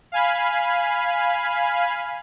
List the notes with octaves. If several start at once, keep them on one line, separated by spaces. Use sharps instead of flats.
F5 G#5 B5